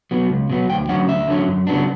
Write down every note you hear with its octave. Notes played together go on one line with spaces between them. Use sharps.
B2 F#3 B3
C#2
B2 F#3 B3
D2 G5
D3 F#3 C#4 F#5
D2 E5
D3 F#3 C#4
F#2
C#3 F#3 B3 D4